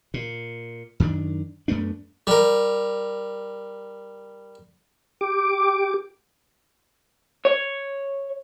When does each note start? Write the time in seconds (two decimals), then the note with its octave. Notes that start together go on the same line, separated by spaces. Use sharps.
0.14 A#2
1.00 F#2 D#3 D4
1.68 F#2 A3 B3 D4
2.27 G3 A#4
5.21 G4 D6
7.45 C#5